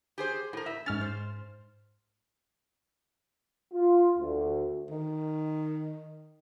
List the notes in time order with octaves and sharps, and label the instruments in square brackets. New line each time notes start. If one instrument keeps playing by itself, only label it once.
[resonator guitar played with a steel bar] G4 G#4 C5
A2 A#4
E5
[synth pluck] G#2 F6 A6 [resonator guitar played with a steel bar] C#4
[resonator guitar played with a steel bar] C5
[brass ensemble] F4
D2
[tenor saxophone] D#3